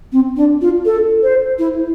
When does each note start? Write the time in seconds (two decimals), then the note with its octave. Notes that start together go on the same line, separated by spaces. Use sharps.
0.12 C4
0.36 D4
0.61 F4
0.86 A4
1.23 C5
1.59 E4